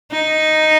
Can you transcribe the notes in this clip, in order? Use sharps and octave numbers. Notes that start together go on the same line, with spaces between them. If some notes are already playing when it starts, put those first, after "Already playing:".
D#4